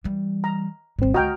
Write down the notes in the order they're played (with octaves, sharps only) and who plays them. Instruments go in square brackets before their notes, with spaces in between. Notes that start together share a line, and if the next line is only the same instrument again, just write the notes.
[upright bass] E3 G3
[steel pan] A#5
[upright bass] D#1 G3 [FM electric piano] G#1 C4
[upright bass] C#2 D3 [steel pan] F#4 G5 [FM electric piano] D#5 A#5 F6